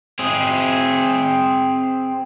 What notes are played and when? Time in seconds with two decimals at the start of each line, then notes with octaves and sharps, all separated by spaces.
0.19 C4 G#4